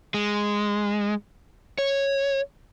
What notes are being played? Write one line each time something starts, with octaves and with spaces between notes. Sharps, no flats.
G#3
C#5